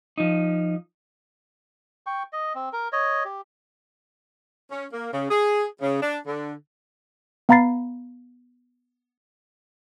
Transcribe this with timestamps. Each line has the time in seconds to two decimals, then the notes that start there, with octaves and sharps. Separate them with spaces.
0.18 F3 D#4
2.07 G5 C#6
2.33 D#5
2.55 C4
2.73 A#4
2.92 C#5 D#5
3.25 G4
4.71 C#4
4.93 A#3
5.13 C#3
5.30 G#4
5.82 C#3
6.03 D4
6.27 D3
7.49 B3 F5 A#5 B5 A6 C7